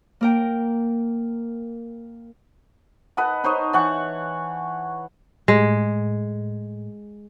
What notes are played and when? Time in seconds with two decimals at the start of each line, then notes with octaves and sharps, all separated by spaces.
0.21 A#3 A#4 G5
3.17 B4 D#5 F#5 A5
3.44 D#4 C5 C#5 D#5
3.73 E3 F#5 C#6
5.48 A2 G#3